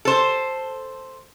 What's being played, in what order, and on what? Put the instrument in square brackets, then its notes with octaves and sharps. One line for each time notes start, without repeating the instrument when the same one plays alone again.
[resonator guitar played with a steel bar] A4 C5